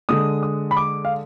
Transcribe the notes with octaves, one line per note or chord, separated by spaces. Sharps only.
D3 G#3 D#6
D#6
B5
D6
F5